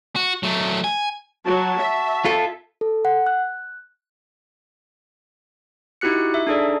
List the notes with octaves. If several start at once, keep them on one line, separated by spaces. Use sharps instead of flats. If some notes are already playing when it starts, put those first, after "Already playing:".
F#4
F#3 A3
G#5
F#3 F#4 A5
E5
F4 A4
A4
F#5
F#6
D#4 E4 F#4 G4 F#6 C#7
E5
D4 D#4 G#4 A4 D5